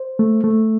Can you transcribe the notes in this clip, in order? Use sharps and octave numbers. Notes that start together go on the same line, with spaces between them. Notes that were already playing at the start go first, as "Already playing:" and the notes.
Already playing: C5
A3
A3